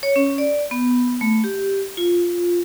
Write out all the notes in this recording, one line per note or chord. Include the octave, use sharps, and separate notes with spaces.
C#5
C#4
D5
B3
A3
G4
F4